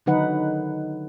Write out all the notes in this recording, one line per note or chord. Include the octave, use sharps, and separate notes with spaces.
D3 D#3 F#3 D#4 B4 F#5